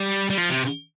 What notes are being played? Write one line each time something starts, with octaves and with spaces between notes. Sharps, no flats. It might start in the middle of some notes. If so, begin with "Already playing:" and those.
Already playing: G3
G3
F3
C3